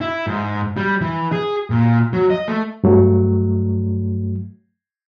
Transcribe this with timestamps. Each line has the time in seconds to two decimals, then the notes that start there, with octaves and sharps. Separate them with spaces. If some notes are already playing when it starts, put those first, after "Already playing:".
0.01 E4
0.27 G#2
0.77 G3
1.01 E3
1.32 G#4
1.70 A#2
2.13 F#3
2.30 D#5
2.48 A3
2.84 G2 F#3 A3